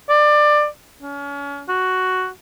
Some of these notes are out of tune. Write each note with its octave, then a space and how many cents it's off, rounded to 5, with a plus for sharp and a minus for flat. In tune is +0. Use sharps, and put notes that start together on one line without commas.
D5 +20
C#4 +35
F#4 +5